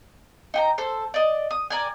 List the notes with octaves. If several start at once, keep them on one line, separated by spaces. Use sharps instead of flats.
D#4 G5 A#5
A4 C5
D5 D#5
D#6
A#4 D5 G5 G#5